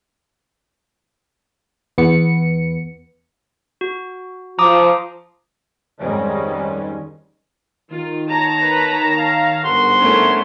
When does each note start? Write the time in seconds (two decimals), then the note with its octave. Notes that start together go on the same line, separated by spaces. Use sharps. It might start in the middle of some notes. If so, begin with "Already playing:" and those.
1.98 E2 B3 C#7
3.81 F#4
4.59 F3 A#5 D6 D#6
6.00 F2 G#2 D#3 G3 G#3 C#4
7.91 D#3 F4
8.29 C#5 A5 A#5
8.62 B4
9.16 F5
9.63 G1 G#2 F#4 A#4 C6
10.00 A3 C#4 E4